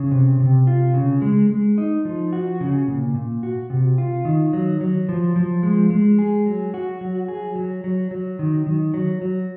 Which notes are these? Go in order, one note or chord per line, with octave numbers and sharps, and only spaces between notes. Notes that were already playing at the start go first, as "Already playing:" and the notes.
Already playing: C#3
C3
C3
F4
C#3
G#3
G#3
D#4
F3
F#4
C#3
A#2
A#2
F#4
C3
F4
D#3
F#3
F#3
F3
F3
G#3
G#3
G#4
F#3
F#4
F#3
G#4
F#3
F#3
F#3
D#3
D#3
F#3
F#3